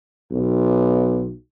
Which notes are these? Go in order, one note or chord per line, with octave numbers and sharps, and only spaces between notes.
B1